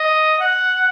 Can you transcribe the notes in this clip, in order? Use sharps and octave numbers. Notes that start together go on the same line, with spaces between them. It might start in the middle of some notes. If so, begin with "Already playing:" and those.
Already playing: D#5
F#5